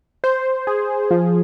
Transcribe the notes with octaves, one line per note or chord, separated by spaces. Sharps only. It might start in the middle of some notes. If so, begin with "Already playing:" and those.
C5
G#4
F3